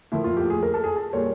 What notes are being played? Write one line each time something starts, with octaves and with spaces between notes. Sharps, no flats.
A2 F3 A#3 E4
F4
G4
G#4
A#4
A4
G#4
A4
A#2 G3 A#3 C#5